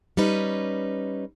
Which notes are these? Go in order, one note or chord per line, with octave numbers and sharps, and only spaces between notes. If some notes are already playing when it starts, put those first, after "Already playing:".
G3 C#4 D#4 B4